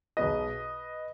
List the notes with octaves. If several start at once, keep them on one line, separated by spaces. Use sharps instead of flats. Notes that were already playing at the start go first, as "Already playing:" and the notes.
B1 B2 G#3 B4 D#5